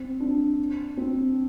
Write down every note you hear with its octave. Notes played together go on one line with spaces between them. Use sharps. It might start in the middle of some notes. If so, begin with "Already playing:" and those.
Already playing: C4
D4
C4